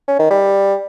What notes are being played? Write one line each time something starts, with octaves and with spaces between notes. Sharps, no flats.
C#4
D#3
G3